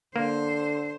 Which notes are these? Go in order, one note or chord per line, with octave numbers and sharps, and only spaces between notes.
D3 A#3 C5